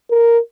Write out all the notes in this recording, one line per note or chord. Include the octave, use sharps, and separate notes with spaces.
A#4